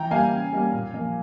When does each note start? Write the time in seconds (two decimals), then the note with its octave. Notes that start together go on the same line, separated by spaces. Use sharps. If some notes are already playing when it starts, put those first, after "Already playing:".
Already playing: E3 G5 A#5
0.11 G3 A#3 F5 G#5
0.32 C#3
0.53 G3 A#3
0.73 A#2
0.93 F3 A#3